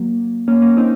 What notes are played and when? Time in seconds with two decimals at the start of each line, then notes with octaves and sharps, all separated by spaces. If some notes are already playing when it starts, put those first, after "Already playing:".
Already playing: F#3 A#3
0.48 A#3 C#4
0.62 A#3 C#4
0.77 C4 D#4